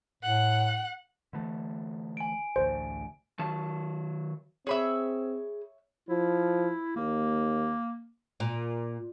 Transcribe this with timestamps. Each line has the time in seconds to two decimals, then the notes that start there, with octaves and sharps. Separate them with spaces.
0.23 A2 F#5 F#6
1.33 D3 E3 A3
2.17 G#5 D7
2.56 A1 D2 C5
3.39 D#3 F#3 A5
4.67 C4 G#4 C#5 E5 B5 E6
6.09 F3 E4
6.96 D#2 A#3
8.40 A#2